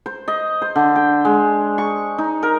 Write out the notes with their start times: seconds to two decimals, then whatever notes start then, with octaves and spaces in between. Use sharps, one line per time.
0.06 C5
0.28 D#5
0.62 C5
0.76 D3
0.95 G5
1.25 G#3
1.78 C#6
2.18 D#4
2.43 A#4